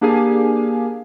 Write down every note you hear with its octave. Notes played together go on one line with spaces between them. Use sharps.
A#3 D4 G4 G#4 F5 G#5